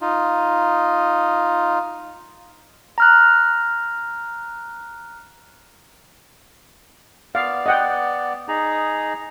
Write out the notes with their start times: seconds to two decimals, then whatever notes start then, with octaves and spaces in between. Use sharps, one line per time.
0.01 D#4 F4
2.98 A#5 F6 F#6
7.35 B3 D5 F5
7.66 D#5 F#5 G5
8.48 D#4 G#4 A#5